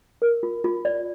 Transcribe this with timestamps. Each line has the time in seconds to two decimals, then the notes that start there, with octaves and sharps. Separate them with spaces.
0.22 A#4
0.43 F4
0.64 F4
0.85 D5